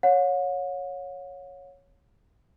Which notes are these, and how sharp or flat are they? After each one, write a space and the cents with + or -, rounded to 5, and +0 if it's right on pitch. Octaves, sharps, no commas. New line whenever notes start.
C#5 +0 F#5 -40